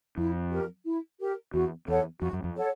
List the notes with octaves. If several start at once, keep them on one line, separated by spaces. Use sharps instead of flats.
F2 E4
G4 A#4
E4
G4 A#4
E2 F#4
E2 A4 C#5 F#5
F2 F#4
F#2
F2
A4 C#5 F#5